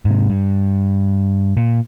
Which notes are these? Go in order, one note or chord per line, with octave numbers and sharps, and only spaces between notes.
G#2 C3
G2
A#2